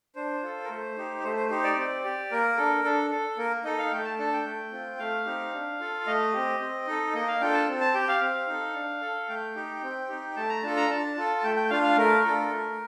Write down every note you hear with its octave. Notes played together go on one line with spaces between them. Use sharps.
D4 C5
F4 A4
A#4
A3 C5
D#4 G4
A3 C5
C5
D#4 G4 C5
D5
C4
G4
A#3 A#4
D4 A4
D4 A4
A4
A#3 A#4
D#4 A4 D#5
F5
A3 G5
A5
D4 A4 A5
G5
A3
C4 F4
A3 F5
C4 D#4 G4
D4
F4 A4
A3 D#5
C4 G4
C4
D#4 A4
A#3 D#5
F5
D4 F4 A4 G5
A5
C4
A5
G4 G5
F5
C4
D#4 A4
D4
A4
A3 G5
D#4 G4
C4
D#4 G4
A3 A5
A#5
D4 F4 A4 A5
A#5
D4 A5
F4 A4
A3 G5
G5
D4 F4 F5
F5
A3 A#4
D4 F4 A4
A3